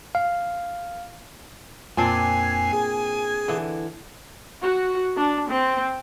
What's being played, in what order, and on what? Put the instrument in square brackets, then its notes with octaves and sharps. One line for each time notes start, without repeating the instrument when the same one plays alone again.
[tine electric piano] F5
[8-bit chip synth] F2 C7 [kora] A#2 C4 D4 [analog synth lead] G#5
[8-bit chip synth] G#4
[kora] D3 E3
[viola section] F#4
D4
C4